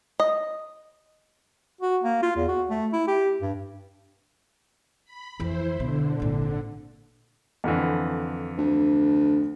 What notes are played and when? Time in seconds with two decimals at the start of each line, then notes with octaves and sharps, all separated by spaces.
0.20 D#5
1.81 F#4
2.03 A#3
2.23 F4
2.36 E2
2.48 F#4
2.70 A3
2.93 E4
3.07 G4
3.42 G2
5.05 B5
5.40 F2 E3 E4 C5
5.80 B2 D3
6.20 G#1 A#2 D3
7.64 F2 D3 E3
8.57 D2